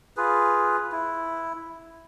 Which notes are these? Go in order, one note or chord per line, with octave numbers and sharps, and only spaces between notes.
F4 G#4 B4
E4